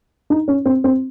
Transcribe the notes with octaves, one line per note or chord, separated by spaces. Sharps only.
D#4
C#4
C4
C4